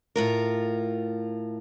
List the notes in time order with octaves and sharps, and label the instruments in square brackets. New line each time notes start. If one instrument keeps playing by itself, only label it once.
[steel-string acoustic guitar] A2 F4 A#4